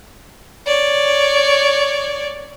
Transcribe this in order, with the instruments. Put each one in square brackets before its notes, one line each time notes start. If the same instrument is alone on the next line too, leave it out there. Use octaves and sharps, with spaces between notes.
[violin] C#5 D5